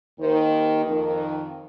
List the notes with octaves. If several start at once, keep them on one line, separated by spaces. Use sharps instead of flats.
D#2 D#3 C5
F2 D#3 A#4